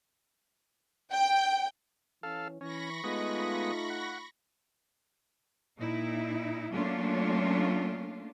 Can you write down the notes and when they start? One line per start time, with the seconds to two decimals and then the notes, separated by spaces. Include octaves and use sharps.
1.11 G5
2.23 E3 C#4 A4 F5
2.61 E3 C#4 B5 C#6 A#6
3.04 G#3 A3 B3 D#4 F4 D#5
3.90 F#5
5.79 A#2 D#4 E4
6.73 F#3 A3 A#3 C#4 D4 F4